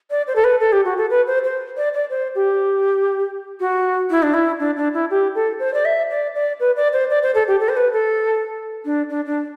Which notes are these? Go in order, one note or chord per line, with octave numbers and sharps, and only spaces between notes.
D5
C5
A4
B4
A4
G4
F#4
A4
B4
C5
C5
D5
D5
C5
G4
F#4
E4
D4
E4
D4
D4
E4
G4
A4
C5
D5
E5
D5
D5
B4
D5
C5
D5
C5
A4
G4
A4
C5
B4
A4
D4
D4
D4